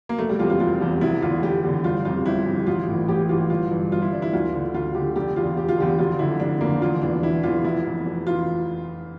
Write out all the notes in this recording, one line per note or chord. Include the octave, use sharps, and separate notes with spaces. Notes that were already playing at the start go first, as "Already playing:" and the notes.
A#3
F1 A3
G3
E2 C3 E3 F4
F4
F1 F4
E2 C3 E3
F1 E4
E2 D3 F4
F1 G4
E2 D3
G1 F4
F2 C3 F4
G1 E4
F2 C3
A1 F4
A2 E3
A1 G4
A2 E3 F4
G1 F4
G2 E3
G1 F4
E4
G2 E3 D4
E4
D2 F4
D3
D2 F4
D3 G4
F1 G4
E2 D3 F4
F1 G4
F4
E2 D3 G4
F1 F4
F2 D3 E4
F1 D4
F2 D3 A#3
E1 F4
E2 E3 D4
E1 E4
E2 E3 F4
F1 E4
F2 E3
F1
E3 F4